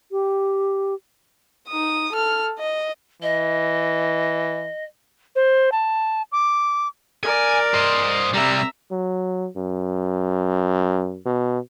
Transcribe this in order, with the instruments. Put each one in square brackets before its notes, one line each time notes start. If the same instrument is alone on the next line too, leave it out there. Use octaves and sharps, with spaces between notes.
[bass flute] G4
[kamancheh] D#4 D#6
A4 F6
D#5
[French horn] E3 [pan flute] D#5
[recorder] C5
A5
D6
[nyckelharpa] A#4 D5 [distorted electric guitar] G#5
[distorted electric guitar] C5 D#5
[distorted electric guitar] C3 G3 [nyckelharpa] E5 A#5
[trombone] F#3
F#2
B2